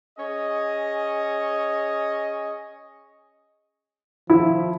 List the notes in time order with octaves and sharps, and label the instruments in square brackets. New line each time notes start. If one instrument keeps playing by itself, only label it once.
[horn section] C#4 G#4 C#5 D#5
[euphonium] F3 [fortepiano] E4